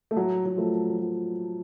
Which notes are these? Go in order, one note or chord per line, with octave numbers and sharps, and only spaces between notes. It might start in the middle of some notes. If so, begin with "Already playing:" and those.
A3
A2 F#3
F#3
F3 A3
F3
F#3